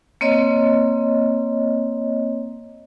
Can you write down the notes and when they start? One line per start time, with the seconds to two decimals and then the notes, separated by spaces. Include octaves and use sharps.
0.21 A#3 C4 C#5 D#5